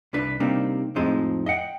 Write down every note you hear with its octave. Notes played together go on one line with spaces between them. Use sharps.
C2 D4 B4
C3 G3 A#3 C4 D4 D#4
F2 A2 F3 G#3 C4 D#4
D#5 E5 F#5 G5